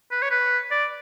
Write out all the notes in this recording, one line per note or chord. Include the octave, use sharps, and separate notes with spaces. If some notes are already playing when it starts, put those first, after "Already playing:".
B4
C#5
B4
D5